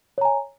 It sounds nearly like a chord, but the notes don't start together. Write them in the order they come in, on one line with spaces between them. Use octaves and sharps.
C#5 A#5 G#5